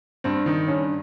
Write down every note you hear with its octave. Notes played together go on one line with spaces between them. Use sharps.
G2 C4
D#3
G2 C#4